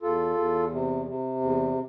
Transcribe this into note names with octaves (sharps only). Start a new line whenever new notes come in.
E2 F4 A4
E2
C3
C3
E2